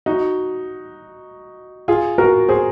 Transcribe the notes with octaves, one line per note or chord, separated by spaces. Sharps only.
D#4 F#4
F4 G#4
F#4 A#4
G#4 C5